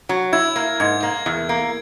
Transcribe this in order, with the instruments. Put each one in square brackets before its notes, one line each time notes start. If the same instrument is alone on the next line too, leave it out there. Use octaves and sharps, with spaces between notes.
[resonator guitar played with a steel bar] F#3
[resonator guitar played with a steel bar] E4 [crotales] G#6
[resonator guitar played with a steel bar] A#3
[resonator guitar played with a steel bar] G#2 [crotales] G#6
[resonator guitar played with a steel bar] A#3
E2
A#3